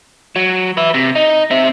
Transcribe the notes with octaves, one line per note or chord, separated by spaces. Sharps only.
F#3
B4 E5
C3
D#4
C4 E5